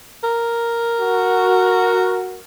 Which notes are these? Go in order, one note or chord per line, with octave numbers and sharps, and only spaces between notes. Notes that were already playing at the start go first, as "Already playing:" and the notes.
A#4
F#4